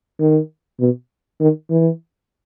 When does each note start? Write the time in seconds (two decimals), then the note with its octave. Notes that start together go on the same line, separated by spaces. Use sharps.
0.20 D#3
0.80 B2
1.40 D#3
1.70 E3